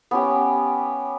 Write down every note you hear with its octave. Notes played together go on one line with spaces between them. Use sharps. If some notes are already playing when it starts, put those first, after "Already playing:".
B3 C#4 G4